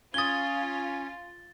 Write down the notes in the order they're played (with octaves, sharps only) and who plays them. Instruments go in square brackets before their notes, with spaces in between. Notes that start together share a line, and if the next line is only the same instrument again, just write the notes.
[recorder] C#4 [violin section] F4 [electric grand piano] D#6 G#6 [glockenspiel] A6 G7